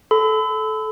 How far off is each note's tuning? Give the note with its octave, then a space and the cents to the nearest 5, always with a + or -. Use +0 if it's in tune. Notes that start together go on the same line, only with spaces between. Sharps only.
A4 -20 B5 +40